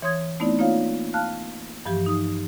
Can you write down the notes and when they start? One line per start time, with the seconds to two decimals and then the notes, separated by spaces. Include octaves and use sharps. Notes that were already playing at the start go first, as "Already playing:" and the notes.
0.02 E3 C#5 C6 D#6 G#6
0.40 A3 B3 C4 D#4 E4 D5
0.59 A#3 D#4 F4 C#5 F5
1.14 F5 A5 F6 F#6
1.85 G2 E3 F3 G4
2.06 D#4 D#6